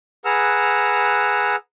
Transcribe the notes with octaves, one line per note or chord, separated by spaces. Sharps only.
G#4 B4 F#5 A#5 E6 F6